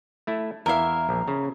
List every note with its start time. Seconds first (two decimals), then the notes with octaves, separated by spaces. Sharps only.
0.27 A3 E4
0.66 E2 E4 A#4 E5 F5
1.09 A#1
1.28 C#3